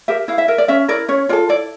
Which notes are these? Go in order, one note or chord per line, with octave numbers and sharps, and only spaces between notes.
G4 A#4 E5
E4 F5
E5
A#4 E5
D5
C#4 E5
E4 A#4 D5
C#4 C#5
F4 A4 D5
E4 D5